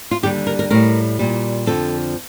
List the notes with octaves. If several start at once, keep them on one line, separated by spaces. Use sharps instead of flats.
F4
D#2 D3 G3 G4
A#4
A#4
A2 G3 A#4
A#2 G3
F2 D3 F3 A4